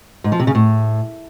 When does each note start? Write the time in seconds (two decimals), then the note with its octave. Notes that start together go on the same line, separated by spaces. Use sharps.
0.24 G#2
0.32 F3
0.40 C3
0.47 C#3
0.55 A2